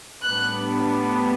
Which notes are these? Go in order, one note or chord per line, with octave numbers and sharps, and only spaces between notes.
A2 G3 B3 D4 F#6